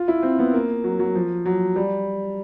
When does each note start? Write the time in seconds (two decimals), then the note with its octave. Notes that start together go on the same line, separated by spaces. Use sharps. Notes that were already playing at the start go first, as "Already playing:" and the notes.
Already playing: F4
0.08 E4
0.23 C4
0.39 B3
0.54 A#3
0.84 F#3
0.99 F#3
1.15 F3
1.46 F#3
1.76 G3